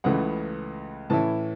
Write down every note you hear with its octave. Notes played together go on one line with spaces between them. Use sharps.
C#2 C#3 E3 A3 F#5
A2 E3 C#4 E4 A5